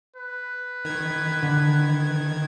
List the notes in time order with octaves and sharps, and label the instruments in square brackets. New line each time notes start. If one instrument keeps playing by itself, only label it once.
[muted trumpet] B4
[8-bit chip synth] D#3 G#6
[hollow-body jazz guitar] D3